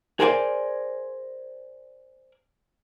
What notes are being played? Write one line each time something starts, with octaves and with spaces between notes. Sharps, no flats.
G#4 A#4 C5 D5 F#5 G#5